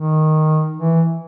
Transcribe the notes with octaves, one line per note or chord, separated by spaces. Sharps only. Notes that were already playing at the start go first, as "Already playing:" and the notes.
Already playing: D#3
E3